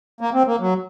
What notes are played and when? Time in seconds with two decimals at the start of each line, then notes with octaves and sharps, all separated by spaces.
0.21 A#3
0.34 C4
0.47 A#3
0.60 F#3